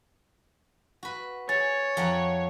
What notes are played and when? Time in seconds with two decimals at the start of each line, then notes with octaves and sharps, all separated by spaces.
1.03 F#4 B4
1.49 G#4 C#5 A6
1.97 F2 F#5 A#5